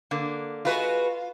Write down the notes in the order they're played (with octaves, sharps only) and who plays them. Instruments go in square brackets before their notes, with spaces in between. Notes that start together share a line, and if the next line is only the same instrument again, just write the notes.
[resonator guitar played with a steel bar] D3 A#3
[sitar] G#3 F#4 B4 [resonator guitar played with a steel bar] F4